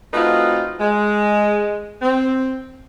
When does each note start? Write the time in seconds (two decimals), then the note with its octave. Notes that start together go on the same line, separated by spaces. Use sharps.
0.13 A3 C4 D#4 F4 F#4 B4
0.80 G#3
2.02 C4